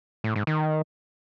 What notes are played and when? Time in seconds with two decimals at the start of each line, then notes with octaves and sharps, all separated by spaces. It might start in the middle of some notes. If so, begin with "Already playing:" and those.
0.24 A2
0.36 G#2
0.47 D#3